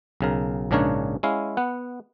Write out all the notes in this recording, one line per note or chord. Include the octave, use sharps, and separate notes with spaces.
B1 C#3 A#4
A#1 G#2 C#3 D4 A#4 C#5
G#3 C#4 E4 F5
B3 F#5